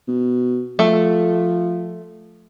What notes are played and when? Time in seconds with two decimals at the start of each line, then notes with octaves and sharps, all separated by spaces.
0.08 B2
0.79 F3 A3